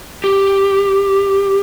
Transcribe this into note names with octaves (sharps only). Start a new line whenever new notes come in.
G4